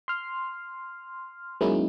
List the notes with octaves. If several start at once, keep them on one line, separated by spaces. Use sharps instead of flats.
C6 F6
F#3 G#3 A#3 C#4 D#4 E4